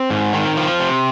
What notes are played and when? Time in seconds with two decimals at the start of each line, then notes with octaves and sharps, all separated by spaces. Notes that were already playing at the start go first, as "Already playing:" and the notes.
Already playing: C4
0.11 G#2
0.33 D#3
0.57 F3
0.80 C3